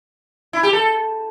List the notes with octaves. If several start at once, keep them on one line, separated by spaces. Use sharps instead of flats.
E4
G4
A4